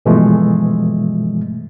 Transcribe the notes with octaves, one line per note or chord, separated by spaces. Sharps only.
G2 B2 E3 F3 G#3 A3